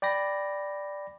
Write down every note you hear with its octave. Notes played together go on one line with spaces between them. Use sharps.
D5 G5 B5 A#6